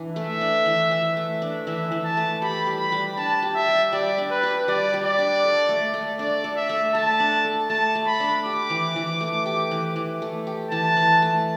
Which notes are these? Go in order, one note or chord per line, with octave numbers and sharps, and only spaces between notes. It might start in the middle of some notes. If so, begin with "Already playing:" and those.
Already playing: E3 D4
A3 E5
D4
E3
E3
A3
D4
E3 E5
E3
A5
A3
G4 B5
G3
B5
G3
D4 A5
G4
E5
G3
G3 D5
D4
B4
G4
G3 D5
G3
D5
D4
A4
A3
A3
D4 D5
A4
E5
A3
A3 A5
D4
A4
A3 A5
A3
B5
D4
G4 D6
E3
E3
A3
G4
E3
E3
A3
G4
E3 A5
E3
A3